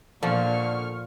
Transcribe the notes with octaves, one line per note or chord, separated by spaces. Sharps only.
A#2 D3 F3 C#6 F6